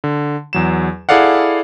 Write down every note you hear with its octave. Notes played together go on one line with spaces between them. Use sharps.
D3
E2 F#3 E7
E4 G#4 A4 D5 F5 F#5